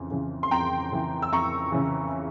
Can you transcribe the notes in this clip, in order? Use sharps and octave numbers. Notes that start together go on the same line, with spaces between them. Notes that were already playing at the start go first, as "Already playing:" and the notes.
Already playing: F2 C#3 E3
C#3 E3
C6
F2 G5 A#5
C#3 E3
E6
F2 A#5 C#6
C#3 E3